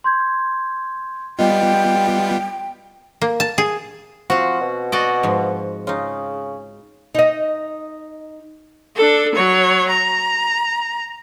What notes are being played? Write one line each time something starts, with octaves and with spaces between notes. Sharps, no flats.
C6 G6 G#6
G3 B3 F4 D#5 G5
A#3
A5
G#4
F3 C4 F#4 F5
B2
F#4 D5 D#5
G#2 F3
C#3 D#4 F4
D#4 D#5
D4 A4
F#3 C#5
A#5